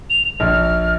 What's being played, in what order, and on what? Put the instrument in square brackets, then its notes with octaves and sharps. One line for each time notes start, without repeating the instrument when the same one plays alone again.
[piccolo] F7
[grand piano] A#1 [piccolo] F6